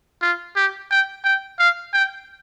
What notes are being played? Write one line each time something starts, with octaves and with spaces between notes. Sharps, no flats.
F4
G4
G5
G5
F5
G5